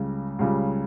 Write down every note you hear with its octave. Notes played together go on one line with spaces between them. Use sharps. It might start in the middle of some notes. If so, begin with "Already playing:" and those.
Already playing: C#2 C#3 G3
C#2 C#3 G3